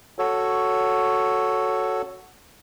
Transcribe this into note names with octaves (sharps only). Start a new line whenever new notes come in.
F#4 A4 C#5